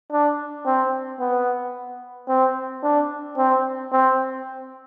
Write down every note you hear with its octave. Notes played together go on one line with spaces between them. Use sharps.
D4
C4
B3
C4
D4
C4
C4